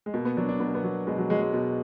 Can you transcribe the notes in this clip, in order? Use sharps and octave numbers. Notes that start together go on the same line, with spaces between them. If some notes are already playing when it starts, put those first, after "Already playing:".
G#3
B2 A#3
B3
F#3 D4
D4
B2 B3
A#3
B3
F#3
B2 G#3
F#3
F#3 G#3
G#3
B2